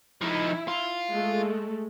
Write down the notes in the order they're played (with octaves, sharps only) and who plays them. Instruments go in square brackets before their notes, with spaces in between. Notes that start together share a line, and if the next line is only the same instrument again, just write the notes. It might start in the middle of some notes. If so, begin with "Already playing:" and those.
[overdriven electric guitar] F3 D#4 [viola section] E4
[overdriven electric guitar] F4
[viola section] G#3 A3 A4